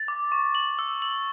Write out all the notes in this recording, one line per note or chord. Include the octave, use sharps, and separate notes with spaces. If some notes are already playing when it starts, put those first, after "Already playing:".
Already playing: A6
D6
C#6
F#7
E6
F#7